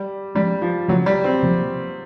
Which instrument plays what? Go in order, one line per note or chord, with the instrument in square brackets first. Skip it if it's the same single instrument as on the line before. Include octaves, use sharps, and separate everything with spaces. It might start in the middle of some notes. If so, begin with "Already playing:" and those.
Already playing: [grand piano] G3
[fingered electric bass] F3 G#3 C#4 [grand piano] G3
[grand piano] F3
[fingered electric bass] C#3 F3 A3 C#4 [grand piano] F#3
[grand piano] G3
C4
[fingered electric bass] C3 F3 A#3